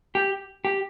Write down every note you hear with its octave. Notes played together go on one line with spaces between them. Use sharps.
G4
G4